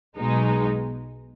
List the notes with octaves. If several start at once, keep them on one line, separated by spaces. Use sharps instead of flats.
B1 B2 G#3 D#4